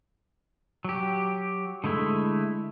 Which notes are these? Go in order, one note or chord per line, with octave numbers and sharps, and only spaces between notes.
F#3 G4
D3 G#3 A3 E4